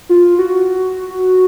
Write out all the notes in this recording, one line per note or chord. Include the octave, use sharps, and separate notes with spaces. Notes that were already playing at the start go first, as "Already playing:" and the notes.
F4
F#4